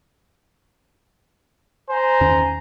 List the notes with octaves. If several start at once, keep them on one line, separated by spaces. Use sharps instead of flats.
C5 G#5 A#5
E2 D#3 C#4